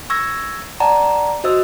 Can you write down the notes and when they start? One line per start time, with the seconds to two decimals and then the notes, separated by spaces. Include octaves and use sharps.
0.10 C#6 E6 G#6 A#6
0.80 D5 F#5 A5 A#5
1.44 F#4 C5 D#5 E6